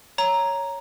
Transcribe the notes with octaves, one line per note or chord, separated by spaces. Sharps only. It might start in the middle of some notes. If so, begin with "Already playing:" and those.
C#5 A#5